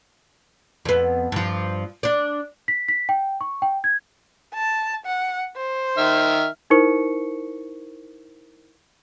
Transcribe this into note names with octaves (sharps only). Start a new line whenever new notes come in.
F2 B3
G2 F3
D4 D5
B6
B6
G5
C#6
G5
G#6
A5
F#5
C5
D#3 E5 F6
D#4 E4 A#4 C5 C#6 C#7